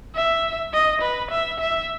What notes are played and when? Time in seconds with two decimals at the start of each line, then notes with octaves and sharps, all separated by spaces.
0.15 E5
0.73 D#5
1.02 B4
1.31 E5
1.60 E5